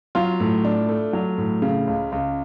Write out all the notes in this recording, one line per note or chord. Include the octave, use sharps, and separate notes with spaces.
F#3 F4
A2
D4
A3
F#3
A2
C#3
C#2
C#2